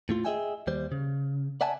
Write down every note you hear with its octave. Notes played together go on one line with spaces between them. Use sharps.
A2 A3 F4
G#4 C5 D#5 E5 G5 G#5
D#2 G3 C5
C#3
D5 E5 F#5 G#5 A5